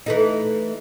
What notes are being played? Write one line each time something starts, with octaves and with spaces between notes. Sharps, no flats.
E3 A3 D#4